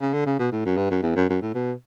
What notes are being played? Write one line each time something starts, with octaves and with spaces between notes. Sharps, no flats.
C#3
D3
C#3
B2
A2
F#2
G2
F#2
E2
F#2
F#2
A2
B2